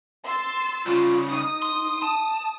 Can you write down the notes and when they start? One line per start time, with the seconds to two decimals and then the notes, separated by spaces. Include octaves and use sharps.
0.23 C6 E6 A6
0.86 C2 C#3 F4
1.30 D#4 D#6
1.62 C6
2.02 A5